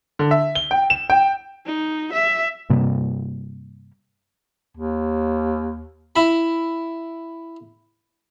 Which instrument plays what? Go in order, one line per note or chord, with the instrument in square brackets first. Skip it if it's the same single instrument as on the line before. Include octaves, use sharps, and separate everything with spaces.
[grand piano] D3
E5
G7
G5
E7
G5
[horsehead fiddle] D#4
E5
[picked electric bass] G2 C3 G3 A#3
[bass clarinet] D#2
[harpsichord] E4 B5